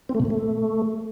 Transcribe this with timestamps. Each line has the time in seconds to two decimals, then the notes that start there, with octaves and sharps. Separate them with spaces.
0.09 C4
0.15 A3
0.20 B2
0.25 A#2
0.30 A3